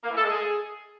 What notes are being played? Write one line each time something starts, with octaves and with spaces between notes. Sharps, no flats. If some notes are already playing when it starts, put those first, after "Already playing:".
A#3
E3
A4
G#3
G#4